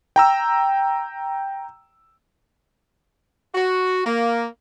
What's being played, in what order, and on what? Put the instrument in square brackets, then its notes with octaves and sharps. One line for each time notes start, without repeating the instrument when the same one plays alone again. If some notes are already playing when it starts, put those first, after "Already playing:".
[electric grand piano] G5 A#5 E6
[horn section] F#4
A#3